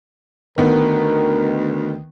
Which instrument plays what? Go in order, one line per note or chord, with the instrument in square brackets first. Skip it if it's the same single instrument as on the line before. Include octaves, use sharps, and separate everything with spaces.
[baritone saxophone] D2 [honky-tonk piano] D#3 B3 [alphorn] A#4